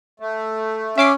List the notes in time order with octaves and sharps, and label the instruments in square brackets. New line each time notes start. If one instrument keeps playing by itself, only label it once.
[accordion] A3
[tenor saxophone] C#4 [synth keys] E5 D6 C7